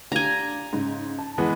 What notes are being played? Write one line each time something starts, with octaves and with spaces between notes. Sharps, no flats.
D4 F4 G4 G#5 A#5
G#2 C#3
A5
E3 G#3 B3